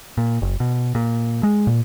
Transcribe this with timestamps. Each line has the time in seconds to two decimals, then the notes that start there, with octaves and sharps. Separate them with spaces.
0.17 A#2
0.42 F#1
0.60 B2
0.95 A#2
1.43 G#3
1.67 A#2